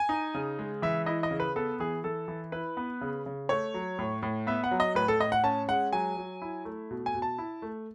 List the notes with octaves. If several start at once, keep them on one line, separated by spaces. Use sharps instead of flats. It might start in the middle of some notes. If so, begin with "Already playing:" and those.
Already playing: G#5
D#4
C#3
G#3
E3 E5
E4 D#5
D#5
C#3
B4
B3 A4
E3 G#4
E3 A4
E3
E4 B4
B3
C#3
C#3
A3 C#5
F#3
A2
A2
B3 E5
F#5
F#3
D#5
A2 B4
A4
A2 D#5
F#5
C#4 A5
G#3 F#5
F#3 G#5
F#3
E4
A3
B2
G#5
B2
A5
E4
A3